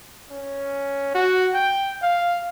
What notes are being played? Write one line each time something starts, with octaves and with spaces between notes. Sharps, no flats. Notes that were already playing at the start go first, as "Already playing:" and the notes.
C#4
F#4
G5
F5